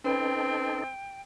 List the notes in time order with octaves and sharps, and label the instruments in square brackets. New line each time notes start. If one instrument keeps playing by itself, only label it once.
[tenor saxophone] C4 [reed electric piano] C#4 B4 [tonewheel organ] D#4 A4 [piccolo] G5